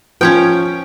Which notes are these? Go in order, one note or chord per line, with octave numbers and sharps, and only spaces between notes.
F3 C#4 C#5 G5